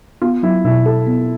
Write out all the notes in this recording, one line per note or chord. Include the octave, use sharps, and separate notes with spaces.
B3 F4
F#3 E4
B2 E4
E4 A4
B3